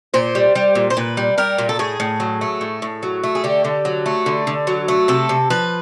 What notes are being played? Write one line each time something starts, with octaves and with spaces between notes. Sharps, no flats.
A#2 C5
G3
G3
A#2
C5
A#2 B4
G3
G3 A#4
A#2
A4
A2 G#4
A2
F#3
A3
A2
A2
F#3
A3
G#4
D3 G4
D3
F#3
A3
D3
D3
F#3
A3
C3 A4
C3
F3 B4